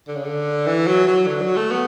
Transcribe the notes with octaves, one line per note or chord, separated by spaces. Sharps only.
D3
C#3
D3
E3
F#3
F#3
D3
F#3
A3
B3